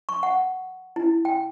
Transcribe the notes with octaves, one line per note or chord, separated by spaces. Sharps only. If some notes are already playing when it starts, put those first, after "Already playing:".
C#6
F#5
E4
G5